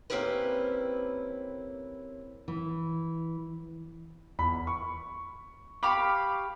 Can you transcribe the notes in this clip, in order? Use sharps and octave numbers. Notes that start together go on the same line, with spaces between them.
A#3 C4 C#4 E4 G4 B4
E3
E2 B5
C#6
G4 F5 B5 C#6 D6